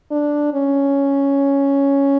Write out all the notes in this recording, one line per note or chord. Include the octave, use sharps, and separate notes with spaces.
D4
C#4